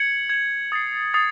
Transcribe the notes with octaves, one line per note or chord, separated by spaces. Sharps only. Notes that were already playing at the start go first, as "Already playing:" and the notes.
Already playing: G#6 C#7 F#7
G#6 C#7 F#7
D#6 A6 C7
D#6 A6 C7